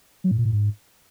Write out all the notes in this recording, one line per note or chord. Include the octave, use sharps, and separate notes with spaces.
F#3
A2
A#2
A2
G#2